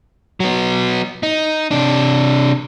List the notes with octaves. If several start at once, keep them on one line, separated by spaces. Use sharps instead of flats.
F#3 B3
D#4
C3 D4